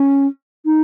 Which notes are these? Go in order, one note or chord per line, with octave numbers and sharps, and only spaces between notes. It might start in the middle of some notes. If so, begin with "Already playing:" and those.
Already playing: C#4
D#4